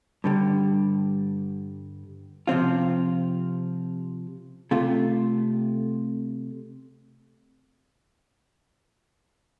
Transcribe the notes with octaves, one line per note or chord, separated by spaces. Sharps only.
G2 D3 G3
C3 F3 C4 F4
C3 A3 F4